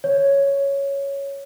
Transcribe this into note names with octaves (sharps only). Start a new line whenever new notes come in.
C#5